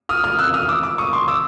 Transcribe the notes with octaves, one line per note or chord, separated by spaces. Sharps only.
D#6 F6
D#6 F6
E6 F#6
D#6 F6
D6 E6
D6 E6
C#6 D#6
C6 D6
D6 E6